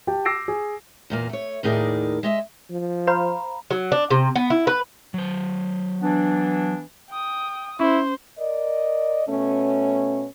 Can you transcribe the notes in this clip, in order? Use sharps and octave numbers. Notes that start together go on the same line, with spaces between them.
G4 G5 A5
D6 E6 A#6 C7 D7
G#4
E2 A#2 A#3
A3 C#5
D#2 A2 D#4 G#4 A#4 D5
G#3 D#5 E5
F3
C5 F5 A#5 B5
F#3
D4
C3
B3
E4
B4
F#3 C5
E3 B3 D4
G5 D#6
C#4 E4 C5
A#4 D5 D#5
B2 A3 C#4